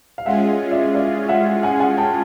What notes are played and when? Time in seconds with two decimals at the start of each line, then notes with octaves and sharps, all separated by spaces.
0.18 F5
0.26 G#3 C#4 F4 G#4 E5 F#5
0.48 D#5
0.71 D5 E5
0.95 D5 E5
1.29 E5 F#5
1.63 F#5 G#5
1.80 F#5 G#5
1.98 G5 A5